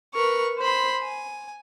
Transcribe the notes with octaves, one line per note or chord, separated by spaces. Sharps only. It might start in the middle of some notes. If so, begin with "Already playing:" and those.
A#4 B4 C#6
C5 B5 C6
G#5